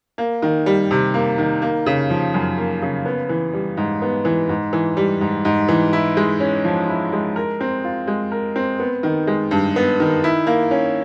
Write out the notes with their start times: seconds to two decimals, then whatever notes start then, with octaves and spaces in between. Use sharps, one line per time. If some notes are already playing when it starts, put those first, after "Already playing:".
0.18 A#3
0.42 D#3
0.66 G3
0.91 C3
1.14 A#3
1.38 D#3
1.62 A#3
1.86 C#3
2.10 F3
2.34 F#2
2.58 A#3
2.82 C#3
3.05 B3
3.29 E3
3.53 G3
3.77 G#2
4.02 B3
4.25 E3
4.49 G#2
4.73 E3
4.97 G3
5.21 G#2
5.45 G#2
5.69 E3
5.93 E4
6.17 G#3
6.40 C#4
6.64 F3
6.89 E4
7.13 G#3
7.36 A#4
7.61 C4
7.84 F4
8.07 G#3
8.32 A#4
8.56 C4
8.79 B3
9.03 D#3
9.27 G#3
9.51 G2
9.76 B3
10.00 D#3
10.24 E4
10.47 A#3
10.71 C#4